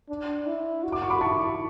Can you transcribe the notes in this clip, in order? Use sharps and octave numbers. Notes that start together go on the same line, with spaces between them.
D4
E4
F#4
D6
C#6
B5 D6
E4 A5 C#6